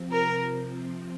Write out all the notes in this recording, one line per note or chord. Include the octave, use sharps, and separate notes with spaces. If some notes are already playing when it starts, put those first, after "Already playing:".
Already playing: C3 F3 C4
A#4